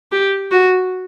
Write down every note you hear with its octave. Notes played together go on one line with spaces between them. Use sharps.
G4
F#4